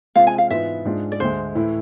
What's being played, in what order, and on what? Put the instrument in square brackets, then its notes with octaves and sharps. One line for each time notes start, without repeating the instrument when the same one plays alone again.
[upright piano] C3 G#3 C4 F4 [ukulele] F5
[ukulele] G#5
F5
[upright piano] G#2 E3 B3 F4 [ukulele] E5
[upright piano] G#2 G#3 D4 F4
[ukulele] D5
[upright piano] D2 D3 G#3 [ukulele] C5
[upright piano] A2 E3 A3 E4